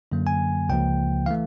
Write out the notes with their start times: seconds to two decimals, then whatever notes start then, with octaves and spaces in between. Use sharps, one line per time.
0.12 F#2 D3 F#3 A#3
0.27 G#5
0.69 C#2 C#3 F3 A#3 G5
1.26 E3 A3 F5